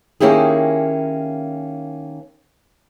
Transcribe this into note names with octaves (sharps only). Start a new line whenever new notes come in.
D#3 A#3 C#4 E4 G4 G#4